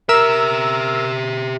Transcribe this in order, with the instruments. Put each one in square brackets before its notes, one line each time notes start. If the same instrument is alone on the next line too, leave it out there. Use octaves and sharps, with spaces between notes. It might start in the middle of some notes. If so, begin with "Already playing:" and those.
[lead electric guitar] G4 E5 [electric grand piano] A#4 [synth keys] E6